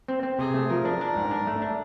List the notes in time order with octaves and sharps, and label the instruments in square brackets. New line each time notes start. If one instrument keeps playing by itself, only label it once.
[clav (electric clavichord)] C4
C4
[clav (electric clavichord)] C3 [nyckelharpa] G#4
[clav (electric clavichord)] A3
[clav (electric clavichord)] F3 [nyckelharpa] A#4
[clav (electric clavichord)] D4
D4
G#2
D4
A3
D4